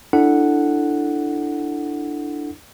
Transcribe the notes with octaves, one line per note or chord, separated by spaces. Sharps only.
D4 E4 A4 F#5